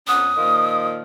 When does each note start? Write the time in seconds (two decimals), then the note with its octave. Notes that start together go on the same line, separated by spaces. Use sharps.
0.07 F2 B3 C#4 D#6
0.36 A#2 D#3 F3